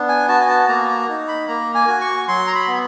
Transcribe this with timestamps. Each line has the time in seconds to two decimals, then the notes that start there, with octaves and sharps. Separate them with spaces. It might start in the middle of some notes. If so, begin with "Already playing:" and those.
Already playing: B3 D4
0.09 G#5
0.28 F#4 A5
0.40 G#5
0.48 A5
0.68 A#3 A#5
0.88 A#5
1.08 D#4
1.28 B5
1.48 A#3 A#5
1.75 G#5
1.87 F#4
2.01 C#6
2.28 F#3 C6
2.47 A#5
2.55 B5
2.67 B3